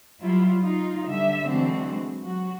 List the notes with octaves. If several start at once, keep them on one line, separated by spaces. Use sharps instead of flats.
F#3 G3 E4 F4
D#4 F4
D3 G3 E5
D3 E3 F#3 G#3 C4 F#4
F#3 F#4